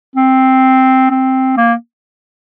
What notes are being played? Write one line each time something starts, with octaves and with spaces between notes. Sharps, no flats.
C4
C4
A#3